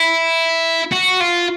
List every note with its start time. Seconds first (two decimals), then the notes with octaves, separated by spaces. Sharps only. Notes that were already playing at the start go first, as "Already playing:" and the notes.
Already playing: E4
0.92 F#4
1.20 F4